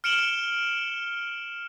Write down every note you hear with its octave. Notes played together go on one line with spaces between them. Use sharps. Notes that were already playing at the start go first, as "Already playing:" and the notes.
F6 C#7 D7 E7 F#7 G7